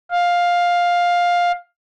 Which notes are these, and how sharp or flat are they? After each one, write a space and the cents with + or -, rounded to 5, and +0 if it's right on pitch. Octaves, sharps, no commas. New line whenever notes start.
F5 +10